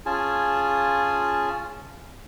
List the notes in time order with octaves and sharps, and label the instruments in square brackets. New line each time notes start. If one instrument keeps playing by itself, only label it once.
[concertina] C#4 F4 G#4 G#5 A5